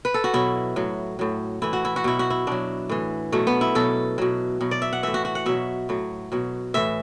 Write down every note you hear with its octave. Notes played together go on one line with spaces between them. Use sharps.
B4
A4
F#4
B2 F#3 E4
A2 F#3
A2 F#3
A2 E3 E4
F#4
E4
F#4
B2 F#3 E4
F#4
E4
B2 F#3 D4
A2 E3
B2 F#3 A3
B3
E4
B2 F#3 A4
B2 F#3
B2 F#3
D5
E5
F#5
A2 E3 E5
F#4
F#4
F#5
B2 F#3 E5
A2 F#3
B2 F#3
A2 E3 E5